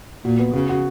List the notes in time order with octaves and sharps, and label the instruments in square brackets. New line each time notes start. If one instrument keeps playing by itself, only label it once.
[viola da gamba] A#2 [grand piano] F#4
[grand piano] B3
[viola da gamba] C#3 [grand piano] F#4
[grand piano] F#4